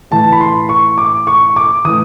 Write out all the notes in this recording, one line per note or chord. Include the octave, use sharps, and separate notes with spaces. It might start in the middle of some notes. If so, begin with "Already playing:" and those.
A2 E3 A5
B5
C6
C#6
D6
C#6
D6
A2 E3 D#6